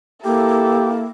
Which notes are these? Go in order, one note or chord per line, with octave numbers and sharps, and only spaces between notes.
A#3 E4 G4 A4